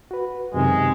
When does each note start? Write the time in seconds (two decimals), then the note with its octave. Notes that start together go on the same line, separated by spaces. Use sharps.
0.11 F#4 B4
0.54 F#2 C3 D#3 G#3